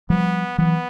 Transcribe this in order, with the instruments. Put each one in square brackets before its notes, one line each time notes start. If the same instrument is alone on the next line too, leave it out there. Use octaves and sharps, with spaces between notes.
[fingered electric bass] F3 G3 [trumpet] B3
[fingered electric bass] E3 F#3 [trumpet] B3